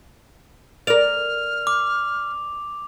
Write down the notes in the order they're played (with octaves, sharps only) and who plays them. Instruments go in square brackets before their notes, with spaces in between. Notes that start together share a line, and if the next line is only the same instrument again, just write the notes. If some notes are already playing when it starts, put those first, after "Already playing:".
[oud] A#4 D5 [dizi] F6 [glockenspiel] F7
[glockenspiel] D6